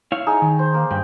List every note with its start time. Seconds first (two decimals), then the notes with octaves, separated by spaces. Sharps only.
0.12 E4 C#5 F5
0.27 D#4 G#4
0.42 D#3
0.59 C5
0.74 A#3
0.91 G2 G5